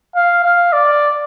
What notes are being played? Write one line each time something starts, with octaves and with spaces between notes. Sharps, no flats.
F5
F5
D5